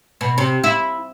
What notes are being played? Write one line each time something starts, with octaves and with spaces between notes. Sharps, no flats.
B2
C3
E4